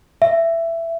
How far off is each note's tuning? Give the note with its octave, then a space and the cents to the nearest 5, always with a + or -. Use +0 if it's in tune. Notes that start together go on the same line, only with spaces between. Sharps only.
E5 +15